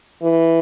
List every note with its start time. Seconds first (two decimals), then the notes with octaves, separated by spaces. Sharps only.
0.22 E3